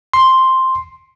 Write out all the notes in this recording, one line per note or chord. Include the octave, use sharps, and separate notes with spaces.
C6